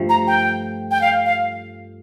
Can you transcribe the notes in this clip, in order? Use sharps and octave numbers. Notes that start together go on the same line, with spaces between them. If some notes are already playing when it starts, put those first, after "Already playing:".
Already playing: G2 F3 A3
A#5
G5
G5
F5
F5